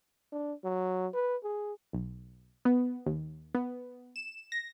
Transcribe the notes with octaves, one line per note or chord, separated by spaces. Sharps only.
D4
F#3
B4
G#4
B1
B3
D#2
B3
E7
A#6